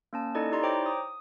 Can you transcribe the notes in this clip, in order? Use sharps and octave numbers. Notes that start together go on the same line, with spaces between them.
A#3 C#4 A5
D#4 E4 A4 D5 D#5
D#4 E4 G4 D5 A#5 C6
C5 C#5 G5 A#5 D6
D#6